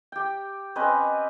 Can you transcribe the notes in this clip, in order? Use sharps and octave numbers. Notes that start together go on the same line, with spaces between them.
G4 G5
C4 C#4 B4 D#5